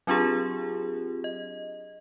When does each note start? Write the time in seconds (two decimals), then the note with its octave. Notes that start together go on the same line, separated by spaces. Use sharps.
0.07 F#3 C4 D4 F4 G4 G#4
1.24 D#5